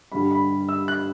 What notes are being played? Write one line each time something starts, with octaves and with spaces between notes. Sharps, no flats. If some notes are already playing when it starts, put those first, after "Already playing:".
G2 D3 G3 B5
B5
E6
F#6